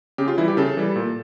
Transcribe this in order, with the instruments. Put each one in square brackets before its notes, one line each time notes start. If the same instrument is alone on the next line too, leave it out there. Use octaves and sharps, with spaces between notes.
[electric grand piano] C#3 G4
F4
E3 E4
G3
G4
C#3 A4
E3 G3
A#2